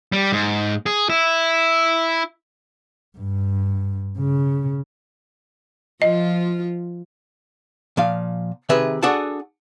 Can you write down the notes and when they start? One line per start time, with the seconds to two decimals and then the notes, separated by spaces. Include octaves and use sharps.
0.12 G3
0.32 G#2
0.86 G#4
1.10 E4
3.18 G2
4.18 C#3
6.02 F3 F4 D#5
7.97 A#2 F3 F5
8.69 C3 D#3 G#4 B4 E5
9.03 D4 F#4 G#4 A4 F#5 A5